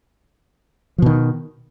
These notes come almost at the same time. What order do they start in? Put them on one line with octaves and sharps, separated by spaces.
F3 B2 D#3